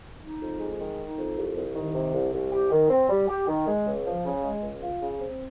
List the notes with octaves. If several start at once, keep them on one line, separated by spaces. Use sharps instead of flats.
D#4
F2
G#3
D#3
D#4
F2
C2
C2
D#3
C3
C2
C2
G4
D#3
C4
G3
G4
D#3
G#3
C#2
F3
C#3
G#3
C#2
F4
C#3
C4